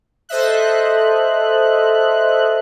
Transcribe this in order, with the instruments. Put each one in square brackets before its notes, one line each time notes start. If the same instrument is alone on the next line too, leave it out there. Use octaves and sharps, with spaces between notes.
[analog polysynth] A4 C5 D#5 E5 F#6